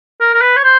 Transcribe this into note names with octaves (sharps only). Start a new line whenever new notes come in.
A#4
A#4
B4
C#5
C5